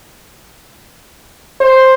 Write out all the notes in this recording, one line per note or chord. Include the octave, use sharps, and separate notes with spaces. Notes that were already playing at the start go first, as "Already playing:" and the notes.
C5